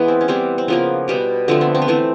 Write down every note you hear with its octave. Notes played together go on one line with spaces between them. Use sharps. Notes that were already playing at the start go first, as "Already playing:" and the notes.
Already playing: E3 G#3 B3
C4
C#4
E3 G3 B3 C4
C4
C#3 F3 A#3 B3
B2 G3 B3
D3 F3 A3 C4
B3
C4
B3
E3 A3 C4